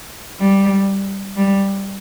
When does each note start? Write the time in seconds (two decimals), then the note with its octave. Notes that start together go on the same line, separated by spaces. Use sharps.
0.40 G3
1.36 G3